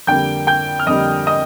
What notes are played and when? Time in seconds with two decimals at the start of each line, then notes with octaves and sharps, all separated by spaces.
0.07 F2 D3 G3 A#3 G5 G6
0.47 G5 G6
0.80 F6
0.87 F2 D3 G3 A#3 D#5 D#6
1.27 D#5 D#6